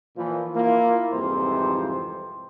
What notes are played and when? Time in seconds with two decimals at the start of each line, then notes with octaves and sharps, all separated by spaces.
0.16 A#2 E3 F3
0.55 A#3 E4 F4
1.13 C2 F2 G#2 C3 E3 C5